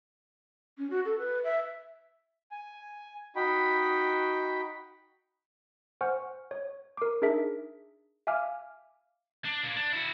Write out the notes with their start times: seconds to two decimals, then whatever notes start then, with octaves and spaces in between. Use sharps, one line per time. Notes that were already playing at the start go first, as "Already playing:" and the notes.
0.78 C#4
0.90 F#4
1.05 A4
1.18 B4
1.44 E5
2.51 G#5
3.36 D#4 F#4 G5 B5
6.01 C5 F#5 G#5 C#6 F6
6.51 C#5
6.97 A#4 D6
7.22 D4 D#4 G#4 A#4 E5 B6
8.27 E5 F5 G#5 D6 F6
9.45 D4
9.64 A#2
9.76 D4
9.92 E4 F#4